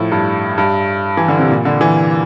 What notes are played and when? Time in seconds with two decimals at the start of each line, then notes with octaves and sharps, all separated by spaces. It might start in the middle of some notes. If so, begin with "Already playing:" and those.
Already playing: A2 F3
0.12 G2
0.58 G2
1.17 E3
1.28 D3
1.39 C3
1.50 A#2
1.65 D3
1.81 E3